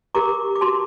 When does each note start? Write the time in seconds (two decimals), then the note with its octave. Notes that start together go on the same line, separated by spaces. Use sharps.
0.15 G4 A#4 A#5 D6
0.55 D6
0.61 F#4 A5 C6